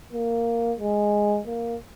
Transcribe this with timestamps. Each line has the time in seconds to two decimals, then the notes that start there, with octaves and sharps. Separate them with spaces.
0.13 A#3
0.80 G#3
1.47 A#3